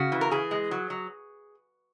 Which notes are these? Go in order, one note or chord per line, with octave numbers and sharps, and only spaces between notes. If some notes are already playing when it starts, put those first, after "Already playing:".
Already playing: C#3 F#4
E3
A#4
E3 G#4
G#3
F#3
F#3